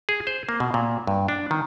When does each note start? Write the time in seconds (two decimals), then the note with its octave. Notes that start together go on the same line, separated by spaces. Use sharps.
0.09 G#4
0.27 C5
0.49 A#3
0.60 B2
0.74 A#2
1.07 G2
1.28 D4
1.51 D#3